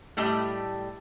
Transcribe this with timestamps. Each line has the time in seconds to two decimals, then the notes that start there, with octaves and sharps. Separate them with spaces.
0.17 A2 G3 A3 G4 D#5